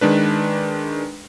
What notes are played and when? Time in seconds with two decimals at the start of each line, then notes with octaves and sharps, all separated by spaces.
0.01 D#3 G#3 D4 B4